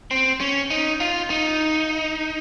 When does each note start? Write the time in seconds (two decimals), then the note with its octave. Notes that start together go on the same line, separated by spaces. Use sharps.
0.11 C4
0.41 C#4
0.71 D#4
1.00 F4
1.30 D#4